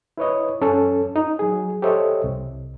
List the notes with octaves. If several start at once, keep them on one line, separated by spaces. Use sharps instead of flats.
E4 B4 C#5 D#5
F#2 C#4 A4 A5
D#4
F#3 G#4
G4 A4 C5 C#5 D#5 E5
C2